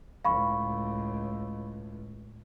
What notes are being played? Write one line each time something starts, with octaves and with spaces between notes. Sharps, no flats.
C#2 A2 F5 B5 C#6